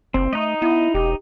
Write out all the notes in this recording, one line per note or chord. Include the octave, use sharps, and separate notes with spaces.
F#1 C4
A3 D#4 D#5
B3 E4
E1 G4